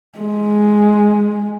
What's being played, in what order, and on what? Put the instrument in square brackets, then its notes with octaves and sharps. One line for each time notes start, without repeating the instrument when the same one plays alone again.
[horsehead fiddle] G#3